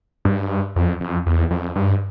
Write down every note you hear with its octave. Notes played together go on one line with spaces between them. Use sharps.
G2
F2
F2
E2
F2
G2